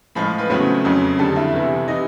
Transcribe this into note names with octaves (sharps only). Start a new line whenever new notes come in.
A2 F3 G#3 B5
B4 B5
E2 C#3 F#3 A3 C4
F2 C#3 F#3
F2 D3 G3 A4 A5
E4 E5
E2 C3 E3
C3 E3 D#4 D#5